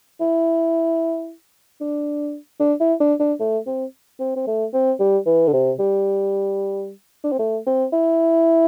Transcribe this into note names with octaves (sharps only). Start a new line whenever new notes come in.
E4
D4
D4
E4
D4
D4
A3
C4
C4
C4
A3
C4
G3
E3
D3
C3
G3
D4
C4
A3
C4
E4